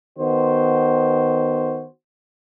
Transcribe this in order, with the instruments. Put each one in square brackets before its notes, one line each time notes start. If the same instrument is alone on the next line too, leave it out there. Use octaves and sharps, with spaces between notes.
[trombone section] D#3 B3 F#4 C5